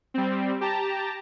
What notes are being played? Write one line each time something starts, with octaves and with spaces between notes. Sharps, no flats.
G3 C4
G4 A5 A#5